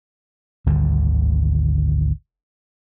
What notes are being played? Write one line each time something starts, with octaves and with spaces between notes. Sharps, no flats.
G#1 D2 D3 G3